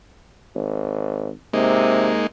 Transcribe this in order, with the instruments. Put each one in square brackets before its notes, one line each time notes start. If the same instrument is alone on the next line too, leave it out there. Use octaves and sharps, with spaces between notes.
[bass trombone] G#1
[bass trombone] C3 [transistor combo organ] G#3 A#3 D#4